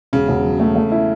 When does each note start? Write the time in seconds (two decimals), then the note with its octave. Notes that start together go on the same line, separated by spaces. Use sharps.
0.13 E1 C#3
0.29 E1
0.44 F#3
0.60 A3
0.76 A3
0.92 E4